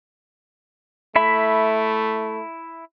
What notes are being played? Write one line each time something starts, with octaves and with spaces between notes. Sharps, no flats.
A3 E4 E5 B5